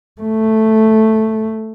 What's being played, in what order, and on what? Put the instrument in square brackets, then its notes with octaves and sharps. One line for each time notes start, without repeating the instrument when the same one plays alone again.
[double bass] A3